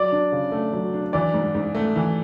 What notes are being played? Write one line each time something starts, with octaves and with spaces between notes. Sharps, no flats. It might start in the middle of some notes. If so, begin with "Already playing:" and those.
Already playing: F#3 D5
D4
C#3
A3
F#3
D4
E3 D5
G#2
G#2
A3
E3